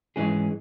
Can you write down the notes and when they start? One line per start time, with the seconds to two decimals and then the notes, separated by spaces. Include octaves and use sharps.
0.16 G#2 E3 G#3 C#4 G#4